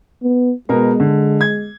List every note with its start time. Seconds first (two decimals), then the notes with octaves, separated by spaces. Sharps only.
0.23 B3
0.69 B2 G#3 B3 A#4
1.00 D3
1.41 G#6